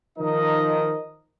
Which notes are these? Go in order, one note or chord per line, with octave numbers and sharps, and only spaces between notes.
D#3 F3 D#4 A#4 D#5